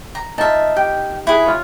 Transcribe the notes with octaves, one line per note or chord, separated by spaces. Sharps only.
A#5
D#4 F4 E5 A5
G4 G5
E4 G#4 B4
F4 C#5